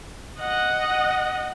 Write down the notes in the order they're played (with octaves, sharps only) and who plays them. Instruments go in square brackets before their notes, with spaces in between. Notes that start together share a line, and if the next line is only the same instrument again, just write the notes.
[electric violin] D#5 F#5